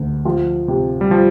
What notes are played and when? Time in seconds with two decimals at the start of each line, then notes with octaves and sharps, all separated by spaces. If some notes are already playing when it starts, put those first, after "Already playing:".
Already playing: D2
0.25 F3
0.68 C3
1.01 G3
1.11 F3